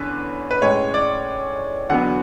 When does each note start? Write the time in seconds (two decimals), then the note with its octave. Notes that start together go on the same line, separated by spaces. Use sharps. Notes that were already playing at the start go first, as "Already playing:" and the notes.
Already playing: E2 D3 C#4 B4
0.51 B4
0.62 A2 G#3 C#4 C#5
0.94 D5
1.90 E2 D3 F#3 B3 F#5